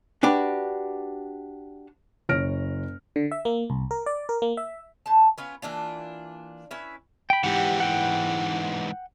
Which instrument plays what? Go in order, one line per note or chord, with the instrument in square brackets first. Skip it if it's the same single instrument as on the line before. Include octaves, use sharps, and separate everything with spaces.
[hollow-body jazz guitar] D4 F#4 G4 B4
[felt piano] F#1 C#5 F6 A#6 D7
[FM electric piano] D3
E5
A#3
C2
A#4
D5
A#4
A#3
E5
[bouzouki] A2 A5
B3 C#4 F4
E3 A#3 D4 F4
C#4 E4 B4 E5
[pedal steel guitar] G5 B5
[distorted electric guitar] G#2 E3 [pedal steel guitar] G4 F#5
[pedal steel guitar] F#5 G5